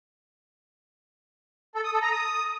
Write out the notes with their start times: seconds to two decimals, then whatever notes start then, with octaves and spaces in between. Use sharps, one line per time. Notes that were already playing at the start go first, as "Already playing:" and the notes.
1.75 A4
1.84 D#6
1.93 A4
2.02 A#5
2.11 D#6